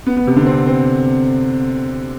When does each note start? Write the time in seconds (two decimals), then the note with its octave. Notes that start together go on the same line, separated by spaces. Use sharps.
0.07 B3
0.17 B3
0.27 C3
0.36 D3
0.46 C4
0.67 C4